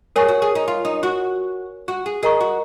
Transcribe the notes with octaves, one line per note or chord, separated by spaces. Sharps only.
G#4 A#4 C#5 G#5 C#6
F#4
G#4
D#4
F4
D#4
F#4
F#4
G#4
G#4 A#4 D#5 A#5 C#6
F#4